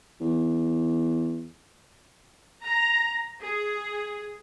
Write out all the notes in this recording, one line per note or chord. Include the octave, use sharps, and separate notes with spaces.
E2
A#5
G#4